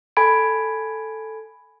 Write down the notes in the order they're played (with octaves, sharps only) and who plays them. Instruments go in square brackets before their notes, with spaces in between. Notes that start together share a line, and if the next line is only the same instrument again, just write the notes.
[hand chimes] A4 G#5 B5 G#6 D7